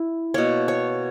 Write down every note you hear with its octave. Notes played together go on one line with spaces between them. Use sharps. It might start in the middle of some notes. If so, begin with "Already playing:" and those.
Already playing: E4
B2 A#3 C#5
C#5